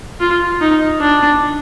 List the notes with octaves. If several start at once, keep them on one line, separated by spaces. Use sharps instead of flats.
F4
D#4
D4